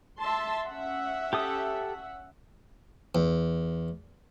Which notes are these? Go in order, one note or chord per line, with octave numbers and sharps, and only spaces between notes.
E5 A5 C6
C#4 E5 F#5
G4 A4 D#6
E2